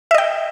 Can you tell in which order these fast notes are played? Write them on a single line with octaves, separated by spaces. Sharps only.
E5 D#5 G5